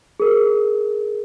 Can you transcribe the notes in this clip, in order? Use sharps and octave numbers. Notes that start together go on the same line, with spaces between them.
G#4 A#4